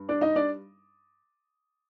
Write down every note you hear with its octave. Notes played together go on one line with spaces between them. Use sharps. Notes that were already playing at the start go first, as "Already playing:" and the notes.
Already playing: G2
D4 D5
D#4 D#5
D4 D5